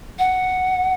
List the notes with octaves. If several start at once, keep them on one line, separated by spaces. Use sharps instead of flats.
F#5